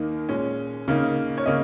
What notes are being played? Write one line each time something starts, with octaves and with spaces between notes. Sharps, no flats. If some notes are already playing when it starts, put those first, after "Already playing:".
Already playing: D#2 D#3 A#3 D#4
A#2 G#3 C#4
C#3 A#3 D#4
C#5
C#3 A#3 D#5